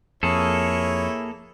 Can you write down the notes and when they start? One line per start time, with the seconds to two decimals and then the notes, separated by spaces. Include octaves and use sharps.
0.23 F2 A#3 E4 G#4 A4 C#5